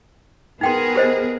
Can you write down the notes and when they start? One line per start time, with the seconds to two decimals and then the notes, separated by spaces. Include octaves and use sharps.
0.61 B3 D#4 G#4 A#4 G5 C6
0.96 G4 C5 D#5